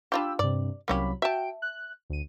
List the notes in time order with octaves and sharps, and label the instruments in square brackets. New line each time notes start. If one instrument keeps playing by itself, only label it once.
[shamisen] D4 F4 G4 [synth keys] G5 B5 E6
[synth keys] G2 C3 [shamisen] D5
[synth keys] C2 F#3 B5 [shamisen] A#3 C#4 G4
[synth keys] F#4 G5 D7 [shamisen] E5 A5
[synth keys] F#6
D2 D#7